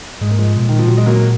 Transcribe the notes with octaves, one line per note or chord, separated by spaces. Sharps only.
G#2 G#3
A#3
F3 G#3
B2
A#2
D#3
F3
F#3
G#3
F#3 A#3